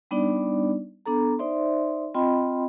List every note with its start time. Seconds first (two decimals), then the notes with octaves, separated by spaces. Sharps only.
0.11 G3 B3 D4 D#4 D5
1.06 B3 D4 A4 A#5
1.39 D#4 C5 D5 E5 C6
2.14 C4 F4 D#5 G5 B5 C6